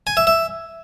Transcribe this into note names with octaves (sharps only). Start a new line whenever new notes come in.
G#5
E5
E5